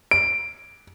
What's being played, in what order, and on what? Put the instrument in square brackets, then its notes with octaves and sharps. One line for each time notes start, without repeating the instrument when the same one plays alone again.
[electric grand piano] D7